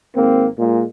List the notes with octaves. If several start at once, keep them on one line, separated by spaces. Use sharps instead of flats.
G#1 A#3 C4
A#2 G#3